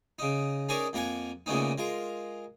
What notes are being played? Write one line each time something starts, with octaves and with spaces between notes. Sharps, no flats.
C#3 D#4
C#4 D#4 G#4 A#4 C#5 D5
F2 A#3 A#4 F#5 G#5
A#2 C#3 A3 B3 C#4 D#4
G#3 F4 A#4